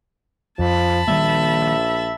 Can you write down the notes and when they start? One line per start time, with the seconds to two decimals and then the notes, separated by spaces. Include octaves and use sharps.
0.59 F2 F3 A5 B5
1.08 A#1 D#3 G3 A#3 E5